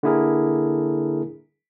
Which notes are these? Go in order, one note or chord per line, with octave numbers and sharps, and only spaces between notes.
D3 A#3 E4 G#4 A#4